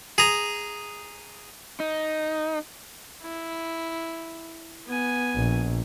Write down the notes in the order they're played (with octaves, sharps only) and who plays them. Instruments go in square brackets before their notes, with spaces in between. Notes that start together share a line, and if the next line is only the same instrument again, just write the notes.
[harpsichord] G#4 A#5
[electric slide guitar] D#4
[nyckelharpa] E4
B3 G#5
[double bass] A#1